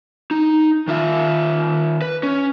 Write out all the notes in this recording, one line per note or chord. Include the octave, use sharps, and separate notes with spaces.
D#4
D#3 F4 E5
B4
C#4